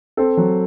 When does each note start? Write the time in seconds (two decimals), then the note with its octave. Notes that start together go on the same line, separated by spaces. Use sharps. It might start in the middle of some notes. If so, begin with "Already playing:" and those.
0.17 C4 A4
0.37 F#3